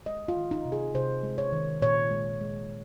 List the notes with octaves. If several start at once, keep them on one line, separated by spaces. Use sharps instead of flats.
G#3 D#5
F4
D#3
D#4
C3
G#4
C3 C5
G#3
C#5
D#3
A#2 C#5
G#3
G#3